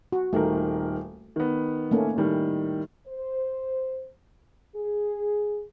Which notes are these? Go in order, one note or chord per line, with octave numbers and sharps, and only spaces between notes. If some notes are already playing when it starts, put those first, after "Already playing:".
F#4
D#1 D#3 A3 A#4
D#3 B3
A3 A#3 C#4
A2 D#3 G3
C5
G#4